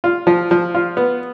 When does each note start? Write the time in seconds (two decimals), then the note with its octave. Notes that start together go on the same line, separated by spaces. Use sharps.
0.04 F4
0.27 F3
0.51 F3
0.74 F4
0.97 B3